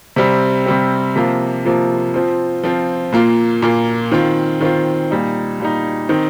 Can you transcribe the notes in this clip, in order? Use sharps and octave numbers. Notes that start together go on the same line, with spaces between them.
C3 G3 C4
C3 G3 C4
C3 F3 A#3 F4
C3 F3 A#3 F4
F3 C4 F4
F3 C4 F4
A#2 A#3 F4
A#2 A#3 F4
D#3 C4 F4
D#3 C4 F4
A#2 G3 D#4
A#2 G3 D#4
D#3 C4 D#4